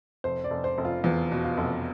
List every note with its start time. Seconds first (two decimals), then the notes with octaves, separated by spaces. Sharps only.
0.24 F1 C5
0.44 D5
0.51 F1
0.64 C5
0.78 F1
0.85 F4
1.04 E2 F4
1.31 B2
1.44 F4
1.57 F1